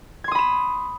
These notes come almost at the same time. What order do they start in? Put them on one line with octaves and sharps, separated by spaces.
G#6 C6 D#6 B5 E7